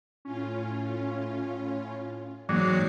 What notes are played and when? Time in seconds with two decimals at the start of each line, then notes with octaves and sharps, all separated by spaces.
0.25 A2 C#4 F4
2.49 G#2 E3 F#3 A#3 C#5 D6 C7